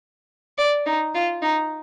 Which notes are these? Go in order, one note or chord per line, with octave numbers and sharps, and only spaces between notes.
D5
D#4
F4
D#4